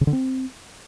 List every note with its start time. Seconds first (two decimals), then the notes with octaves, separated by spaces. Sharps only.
0.01 C#3
0.07 D3
0.13 C4